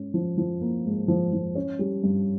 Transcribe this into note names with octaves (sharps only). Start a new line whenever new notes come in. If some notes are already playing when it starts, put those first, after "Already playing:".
Already playing: G#2 C#4
F3
F3
A#3
G#2
F3
F3
C#4
G3
G2